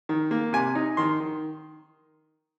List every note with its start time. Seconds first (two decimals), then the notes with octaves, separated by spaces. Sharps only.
0.09 D#3
0.31 A#3
0.53 C3 G#5
0.75 D#4
0.97 D#3 C6
1.20 D#3